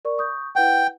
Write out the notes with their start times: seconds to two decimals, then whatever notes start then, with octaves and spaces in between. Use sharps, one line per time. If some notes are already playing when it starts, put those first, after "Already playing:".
0.05 A#4 D5 C#6
0.18 C#6 D#6 G6
0.56 E4 B4 F#5 G5